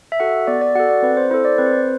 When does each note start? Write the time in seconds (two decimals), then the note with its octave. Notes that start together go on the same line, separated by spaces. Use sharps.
0.12 E5
0.20 F#4 A4 F#5
0.47 B3 D5
0.61 D5
0.75 F#4 F#5
0.79 A4
0.89 D5
1.02 C4 B4
1.17 C5
1.31 E4 C5
1.34 A4
1.45 D5
1.58 C4 B4
1.66 C5
1.73 B4